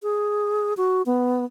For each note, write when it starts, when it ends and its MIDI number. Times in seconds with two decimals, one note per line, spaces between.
0.03 0.74 68
0.77 1.02 66
1.06 1.45 59